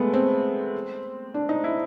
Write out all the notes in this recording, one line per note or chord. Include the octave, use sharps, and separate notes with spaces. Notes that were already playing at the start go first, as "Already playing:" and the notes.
Already playing: G#3 A3 B3
C4
D4
D#4
E4